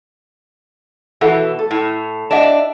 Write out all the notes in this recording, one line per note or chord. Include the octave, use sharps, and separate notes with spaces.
B2 E3 A4 E5 F#5
A4
A2
D4 G4 D#5 E5 F#5